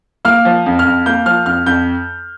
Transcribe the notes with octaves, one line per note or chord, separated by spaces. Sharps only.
A#3 F6
F3
F2
F6
F2
A#3 G6
F3 F6
F2 F6
F2 G6